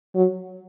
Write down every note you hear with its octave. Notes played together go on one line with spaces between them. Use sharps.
F#3